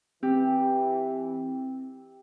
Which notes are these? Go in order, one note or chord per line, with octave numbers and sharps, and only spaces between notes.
E3 C4 G4